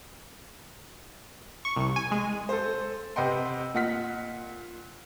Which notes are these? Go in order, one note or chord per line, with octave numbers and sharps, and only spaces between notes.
C#6
C2
G#5
G#3
A4 C5
C3 B4 D#5 F#5 G5 C6
A#2 D#5 F#5 F6 B6